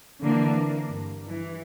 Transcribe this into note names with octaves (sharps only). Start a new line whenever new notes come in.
D3 E3 A#3 C4 D4
A#3
G2
E3